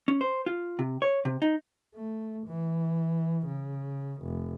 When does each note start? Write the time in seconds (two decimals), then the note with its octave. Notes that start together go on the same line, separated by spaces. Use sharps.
0.08 C#4
0.21 C5
0.46 F4
0.79 C3
1.02 C#5
1.25 C3
1.42 D#4
1.95 A3
2.47 E3
3.47 C#3
4.22 F1